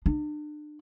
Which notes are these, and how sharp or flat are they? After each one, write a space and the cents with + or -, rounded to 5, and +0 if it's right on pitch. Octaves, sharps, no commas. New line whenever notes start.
D4 +35